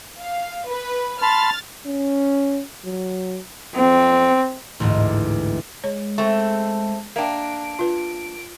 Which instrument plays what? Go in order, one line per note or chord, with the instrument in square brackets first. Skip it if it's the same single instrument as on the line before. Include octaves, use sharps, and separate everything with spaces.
[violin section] F5
B4
[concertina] A5 B5 C6 [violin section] F6 A6
[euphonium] C#4
F#3
[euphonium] F2 [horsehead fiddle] C4
[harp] A1 D2 G#2
[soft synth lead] G#3 [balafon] C#5
[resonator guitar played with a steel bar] A3 C4 [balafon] C#6
[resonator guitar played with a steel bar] A#3 D4 [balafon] E5 G5 [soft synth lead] D7
[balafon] F4 B4